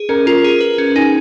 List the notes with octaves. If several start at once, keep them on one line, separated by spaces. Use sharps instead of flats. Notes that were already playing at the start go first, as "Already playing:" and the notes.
Already playing: G#4
C#4 A#4
F4 A#4
G#4
B4
C#4
D#4 G#4